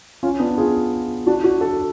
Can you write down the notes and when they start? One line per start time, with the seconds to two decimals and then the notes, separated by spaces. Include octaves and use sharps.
0.23 C#4 F4
0.40 B3 D4
0.58 F4 G#4
1.27 D4 F#4
1.44 D4 F#4
1.61 F#4 A4